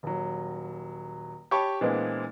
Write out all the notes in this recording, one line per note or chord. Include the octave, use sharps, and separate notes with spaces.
D#1 F#3
G4 C#5 A5 B5 C#6
A#2 E3 G#3 B3 C4 D4